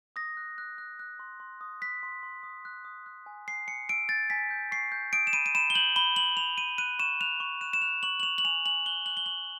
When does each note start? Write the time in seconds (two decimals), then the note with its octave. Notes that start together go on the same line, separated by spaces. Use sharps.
0.16 D#6 A#6
0.37 F#6
0.58 F#6
0.78 F#6
0.99 F#6
1.19 C6
1.40 C6
1.61 D#6
1.82 F#6 B6
2.03 C6
2.23 C6
2.43 D#6
2.65 F#6
2.85 D#6
3.06 F#6
3.26 G#5
3.48 G#5 C7
3.68 G#5 C#7
3.89 E6 D7
4.09 G6 A6
4.30 G#5 B6
4.51 G6
4.72 C#6 C7
4.92 G6
5.13 D#6 D7
5.27 E7
5.33 B5 D#7
5.46 D#7
5.55 B5 E7
5.70 G7
5.75 G6 F#7
5.96 B5 G7
6.16 B5 F#7
6.37 B5 F7
6.57 G6 D#7
6.78 F#6 D#7
6.99 C#6 E7
7.21 F#6 F7
7.40 C#6
7.61 F#6 E7
7.73 E7
7.82 F#6 F7
8.03 C#6 F#7
8.20 F#7
8.23 C#6 F7
8.38 F#7
8.44 G#5 F7
8.65 G#5 F#7
8.86 F#6 G7
9.06 F#6 F#7
9.17 G7
9.26 C#6 F#7